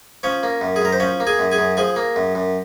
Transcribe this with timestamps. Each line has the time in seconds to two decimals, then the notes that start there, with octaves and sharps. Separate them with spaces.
0.23 F3 C#4 C#5
0.43 A#3
0.61 F#2
0.76 G#4
0.82 F#2 A#4
0.92 C5
1.00 F3 C#4 C#5
1.20 A#3
1.27 G#4 G#5
1.39 F#2
1.52 G#4 G#5
1.58 F#2
1.77 F3 G#4 G#5
1.96 A#3
2.16 F#2
2.35 F#2